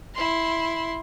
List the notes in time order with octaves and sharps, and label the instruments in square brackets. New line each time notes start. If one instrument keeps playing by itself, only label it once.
[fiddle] E4 C6